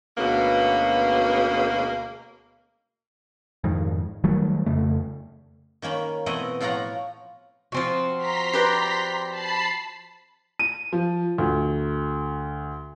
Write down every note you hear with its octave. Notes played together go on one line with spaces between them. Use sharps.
D2 B2 G#3 A#3 B3 C#4
F2 G#2 D#3
D#3 F#3 G3 A3
F2 C#3 A3
D#3 A#3 C#4 B5
B2 E3 A3 C4 D#5 F#5
A2 F3 F4 C#5 F#5 A#5
F3 C4 F#4
A#5 C6 B6
G4 B4 D5
A5 B5 C7
D#7
F3
D2